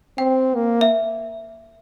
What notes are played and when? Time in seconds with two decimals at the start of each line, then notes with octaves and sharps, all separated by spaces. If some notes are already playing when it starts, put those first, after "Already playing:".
0.18 C4 G5
0.55 A#3
0.81 E5